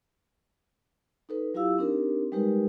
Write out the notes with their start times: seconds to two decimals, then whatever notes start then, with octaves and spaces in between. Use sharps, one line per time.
1.29 D#4 A4 B4
1.54 F#3 E4 F4 G4 F5 E6
1.78 C4 D4 D#4 G4 A#4
2.32 G3 G#3 D#4 G4 A#4 B4